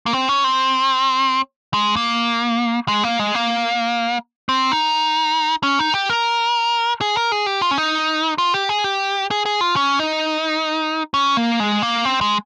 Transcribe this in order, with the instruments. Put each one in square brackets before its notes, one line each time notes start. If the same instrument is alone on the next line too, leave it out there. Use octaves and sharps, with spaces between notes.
[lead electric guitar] A#3
C4
C#4
C4
G#3
A#3
G#3
A#3
G#3
A#3
C4
D#4
C#4
D#4
G4
A#4
G#4
A#4
G#4
G4
F4
C#4
D#4
F4
G4
G#4
G4
G#4
G#4
F4
C#4
D#4
C#4
A#3
G#3
A#3
C4
G#3